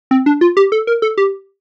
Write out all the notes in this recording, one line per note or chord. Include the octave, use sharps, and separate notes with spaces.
C4
D4
F4
G4
A4
A#4
A4
G4